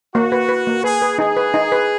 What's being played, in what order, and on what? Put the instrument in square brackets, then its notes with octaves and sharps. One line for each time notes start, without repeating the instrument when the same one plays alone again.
[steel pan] A#3 [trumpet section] F#4
[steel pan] B4
B4
A#3
[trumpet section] G#4 [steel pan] B4
[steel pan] B4
[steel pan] D#4 [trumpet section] G#4
[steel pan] B4
D#4
B4